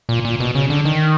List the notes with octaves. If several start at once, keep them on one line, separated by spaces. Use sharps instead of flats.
A#2
A#2
B2
C#3
D3
D#3